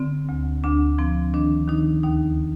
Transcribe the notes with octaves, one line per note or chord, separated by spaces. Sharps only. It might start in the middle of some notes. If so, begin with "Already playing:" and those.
Already playing: D3 C4
D2
D2 D4
F3 C4
D#3 D4
D#3 D#4
D#2 D#4